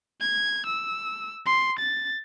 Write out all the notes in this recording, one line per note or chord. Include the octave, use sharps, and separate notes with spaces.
G#6
E6
C6
A6